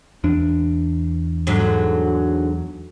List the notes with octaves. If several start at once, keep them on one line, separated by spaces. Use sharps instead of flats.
E2 D4
G#2 D3 F#3